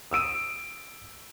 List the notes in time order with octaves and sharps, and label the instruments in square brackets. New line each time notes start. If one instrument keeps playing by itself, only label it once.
[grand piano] D#6 E6 D7 D#7